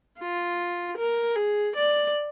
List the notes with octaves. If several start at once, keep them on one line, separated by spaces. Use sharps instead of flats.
F4
A#4
G#4
D5